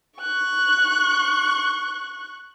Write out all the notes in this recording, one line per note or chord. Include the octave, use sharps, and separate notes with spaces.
C#6 F#6